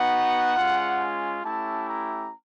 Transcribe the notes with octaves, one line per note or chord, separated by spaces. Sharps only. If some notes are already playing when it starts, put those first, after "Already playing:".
Already playing: B3 D#4 F#4 F#5
G#3 C#4 F4
G#5
A3 C#4 E4 G4 A5
A#5